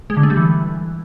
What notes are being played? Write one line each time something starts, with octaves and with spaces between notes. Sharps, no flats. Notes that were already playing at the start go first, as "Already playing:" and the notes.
G#3
D3
A3
G3
E3